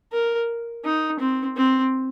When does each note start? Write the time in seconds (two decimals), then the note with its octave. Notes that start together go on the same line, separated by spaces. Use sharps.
0.12 A#4
0.85 D#4
1.19 C4
1.56 C4